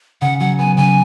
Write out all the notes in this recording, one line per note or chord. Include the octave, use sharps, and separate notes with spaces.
C#3 F#5
F#3 F#5
B3 G#5
C#3 G#5